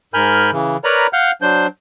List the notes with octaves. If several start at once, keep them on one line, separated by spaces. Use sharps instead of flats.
G#2 A#4 G#5 B5 F6 G6
C#3 E3
A#4 B4 C#5 D5 A#5 B5
F5 F#5 F6 G6
F#3 D4 C5 G6